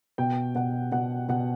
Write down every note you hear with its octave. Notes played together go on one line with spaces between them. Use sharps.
B2 G5
B2 F#5
B2 F#5
B2 F#5